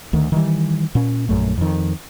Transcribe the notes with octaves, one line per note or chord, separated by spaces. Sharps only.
D2 D#3
D#3 E3 G3
A#2 C#4
A#1 F#2 A3
F2 D#3